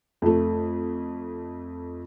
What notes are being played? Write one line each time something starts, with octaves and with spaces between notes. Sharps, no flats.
F2 A3